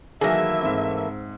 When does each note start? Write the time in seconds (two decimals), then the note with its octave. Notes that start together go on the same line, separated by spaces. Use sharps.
0.21 D#3 E3 F#3 A3 A#3 G#4 E5
0.62 G#2 C4